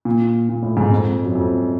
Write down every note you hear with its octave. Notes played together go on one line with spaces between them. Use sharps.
A#2
A#2
A2
G#2
F2
F#2
F2